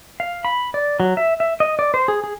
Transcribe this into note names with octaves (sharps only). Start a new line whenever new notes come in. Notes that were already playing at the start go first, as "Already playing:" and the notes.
F5
B5
D5
F#3
E5
E5
D#5
D5
C5
G#4
G#4